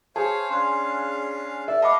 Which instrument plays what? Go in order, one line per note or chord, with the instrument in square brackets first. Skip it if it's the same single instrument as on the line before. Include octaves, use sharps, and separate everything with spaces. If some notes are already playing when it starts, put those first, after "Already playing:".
[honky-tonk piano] G#4 [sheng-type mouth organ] C5 C#5 F5 [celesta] A5
[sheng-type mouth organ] C#4 D4 F5 [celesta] C6 F#6
[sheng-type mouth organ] D5 A5 [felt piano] E5
[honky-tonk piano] D#5 [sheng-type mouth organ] F5 F#5 [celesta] A5 B5 D6